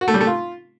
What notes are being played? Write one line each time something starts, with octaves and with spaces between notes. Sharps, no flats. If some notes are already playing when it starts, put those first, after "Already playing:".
F#4
A3
G3
A3
F4